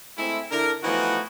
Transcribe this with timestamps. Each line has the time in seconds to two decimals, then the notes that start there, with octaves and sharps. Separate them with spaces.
0.18 G#3 A3 C4 E4
0.52 D3 D4 E4 A#4
0.83 E3 F3 A3 B3 D#4 F#4